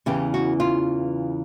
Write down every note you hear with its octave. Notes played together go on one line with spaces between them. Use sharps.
E2 C#3 E3 G4
F#4
F4